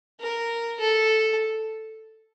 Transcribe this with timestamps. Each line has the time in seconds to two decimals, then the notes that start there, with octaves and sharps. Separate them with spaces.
0.20 A#4
0.80 A4